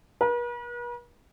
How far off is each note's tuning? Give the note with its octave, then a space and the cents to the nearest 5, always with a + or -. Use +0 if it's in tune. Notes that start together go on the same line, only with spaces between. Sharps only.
B4 -45